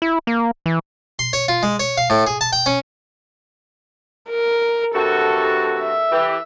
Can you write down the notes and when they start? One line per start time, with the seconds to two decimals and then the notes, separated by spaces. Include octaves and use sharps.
0.02 E4
0.27 A#3
0.66 E3
1.19 C6
1.33 C#5
1.48 F4
1.63 G#3
1.80 C#5
1.98 F5
2.10 A2
2.27 G#4
2.41 A5
2.53 G5
2.66 C#4
4.30 A#4
4.95 G2 C3 F#4 A4
5.80 E5
6.12 E3 G4